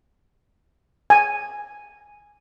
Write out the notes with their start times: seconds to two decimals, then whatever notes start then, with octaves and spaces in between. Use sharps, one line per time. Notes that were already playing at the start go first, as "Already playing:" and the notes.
1.10 G#5